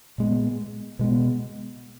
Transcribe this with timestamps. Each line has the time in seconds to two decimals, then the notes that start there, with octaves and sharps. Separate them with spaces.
0.18 A#2 G#3 B3
0.99 B2 G#3 B3